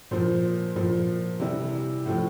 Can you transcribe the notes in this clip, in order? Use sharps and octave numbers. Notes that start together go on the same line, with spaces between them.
A#2 F3 C5
A#2 F3
C3 E3 G3
A2 F3